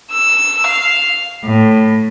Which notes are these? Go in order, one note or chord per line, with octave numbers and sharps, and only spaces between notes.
E6
F5
A2